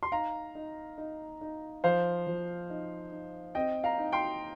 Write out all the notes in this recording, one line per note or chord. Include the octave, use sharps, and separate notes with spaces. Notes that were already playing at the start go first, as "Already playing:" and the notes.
C6
D#4 F5 A#5
D#4
D#4
D#4
F3 C5 F5
F3
D#4
D#4
C4 D#5 G5
F5 A#5
D#4
G5 C6